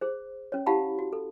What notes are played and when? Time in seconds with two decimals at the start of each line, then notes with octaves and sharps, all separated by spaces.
0.01 G#4 C5
0.52 C#4 C#5
0.66 E4 G4 F5 F#5 A5 B5
0.99 F#4
1.13 A4